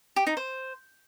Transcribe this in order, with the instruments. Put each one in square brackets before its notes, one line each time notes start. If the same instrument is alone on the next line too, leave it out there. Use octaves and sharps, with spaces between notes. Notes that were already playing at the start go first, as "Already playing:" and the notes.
[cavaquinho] G4
D#4
C5